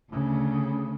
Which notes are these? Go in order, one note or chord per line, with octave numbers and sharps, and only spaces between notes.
D2 C#3